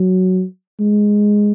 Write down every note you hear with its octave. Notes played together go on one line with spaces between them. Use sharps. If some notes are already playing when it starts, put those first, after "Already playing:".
Already playing: F#3
G#3